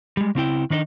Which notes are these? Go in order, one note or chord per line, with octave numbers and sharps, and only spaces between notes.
G3 G#3
C#3 C4 E4 G5
D#3 D4 D#4 D5 D#5